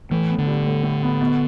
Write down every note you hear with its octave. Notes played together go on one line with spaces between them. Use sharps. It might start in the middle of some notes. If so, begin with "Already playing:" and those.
A2 E3
B3
D3
G3
A2
A2
B3
B2